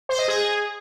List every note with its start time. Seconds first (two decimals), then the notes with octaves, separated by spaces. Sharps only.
0.09 C5
0.19 D#5
0.28 G#4